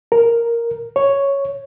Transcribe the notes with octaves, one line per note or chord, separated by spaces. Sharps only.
A#4
C#5